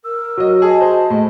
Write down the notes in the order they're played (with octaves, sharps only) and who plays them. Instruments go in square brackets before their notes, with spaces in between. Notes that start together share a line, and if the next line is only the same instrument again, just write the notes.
[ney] A#4 [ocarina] E6
[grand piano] F#3 D#5 [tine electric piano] F#4
[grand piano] G#4 [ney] D#5 [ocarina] A5
[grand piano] C5
A2